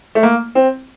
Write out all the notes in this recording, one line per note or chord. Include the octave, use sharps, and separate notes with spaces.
A3
A#3
C4